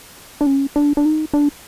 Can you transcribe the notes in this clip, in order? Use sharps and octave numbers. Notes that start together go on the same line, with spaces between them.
D4
C#4
D4
D4
D#4
D4